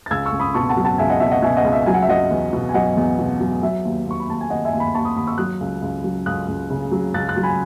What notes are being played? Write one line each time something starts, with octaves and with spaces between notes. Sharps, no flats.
A6
C#2 E6 G#6
C#6 E6
C#2
B5 D#6
B2 A5 C#6
F#5 A5
F#3
F#5 A5
C#2 E5 G#5
D#5 F#5
B2 E5
D#5 F#5
B2 E5 G#5
D#5 F#5
C#2
E5
F#3 G#5
F#5
E5
F#3 D#5 F#5
E2
B2
G#5
F#3 D#5 F#5
E2
B2
F#3
F#3 E5
D#2
D#2 C#6
B5
D#2 A5
G#5
D#2 D#5 F#5
E5 G#5
D#2
G#5 B5
D#2 A5 C#6
B5 D#6
D#2 B5 D#6
C#6 E6
F#3 D#6 F#6
C#2
C#2
F#3
C#2 D#6 F#6
C#2
C#3
F#3
C#2 F#6 A6
F#6 A6
F#3
G#5 B5